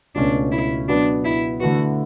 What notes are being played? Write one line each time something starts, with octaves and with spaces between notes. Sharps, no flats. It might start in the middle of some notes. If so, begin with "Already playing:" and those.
C#2 B2 A3 C#4 D4 F#4
E4
B2 F#3 B3 D4
E4
D3 A3 E4 F#4 B4